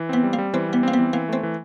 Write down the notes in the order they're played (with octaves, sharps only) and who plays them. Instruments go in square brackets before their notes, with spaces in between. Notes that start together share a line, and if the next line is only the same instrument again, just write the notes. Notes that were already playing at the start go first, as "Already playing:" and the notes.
Already playing: [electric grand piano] E3
[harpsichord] B3 [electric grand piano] C4
[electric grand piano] G3
[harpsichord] A#3
[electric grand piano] G3
[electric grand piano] E3 [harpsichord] C4
[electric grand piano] G3 [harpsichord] B3
[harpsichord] A#3 [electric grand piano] C4
[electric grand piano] E3 [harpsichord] B3
[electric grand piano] E3 [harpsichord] A#3
[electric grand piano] A3 [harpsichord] C4
[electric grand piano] E3